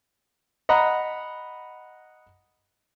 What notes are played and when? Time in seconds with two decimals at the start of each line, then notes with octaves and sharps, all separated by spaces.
0.69 D#5 F#5 A#5 B5